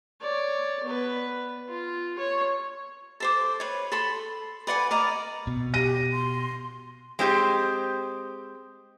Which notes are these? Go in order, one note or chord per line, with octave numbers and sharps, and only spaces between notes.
C#5 D5
B3 B4
F4
C#5
A4 C5 D6
B4 C#5
A4 B5 C6
B4 D5 F#5 G#5
A#4 D5 D#5 A#5
B2
G4 A#6 D#7
C6
G#3 C4 G4